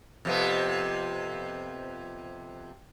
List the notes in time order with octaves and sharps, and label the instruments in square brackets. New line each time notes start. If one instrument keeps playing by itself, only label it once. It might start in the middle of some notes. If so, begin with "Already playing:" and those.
[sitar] F2 C3 B3